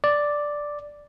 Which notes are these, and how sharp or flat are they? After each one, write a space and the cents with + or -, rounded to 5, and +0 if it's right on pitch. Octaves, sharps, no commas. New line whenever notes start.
D5 +0